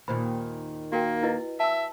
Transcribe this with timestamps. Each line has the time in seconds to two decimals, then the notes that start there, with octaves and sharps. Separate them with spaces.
0.08 D#2 A#2 D#3 C5 B5
0.92 A#3 F#4 A#4 G5
1.23 E4 B4 D#5
1.60 E5 A5 E6